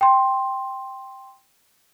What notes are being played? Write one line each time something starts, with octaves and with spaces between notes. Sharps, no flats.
G5 C6